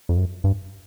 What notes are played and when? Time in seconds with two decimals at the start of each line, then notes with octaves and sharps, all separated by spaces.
0.09 F2
0.17 F#2
0.44 G2